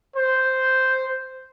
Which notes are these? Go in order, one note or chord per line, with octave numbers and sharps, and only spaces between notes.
C5